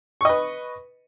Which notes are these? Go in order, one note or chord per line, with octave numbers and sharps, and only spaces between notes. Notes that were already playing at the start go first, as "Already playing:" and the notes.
B4 D#5 C#6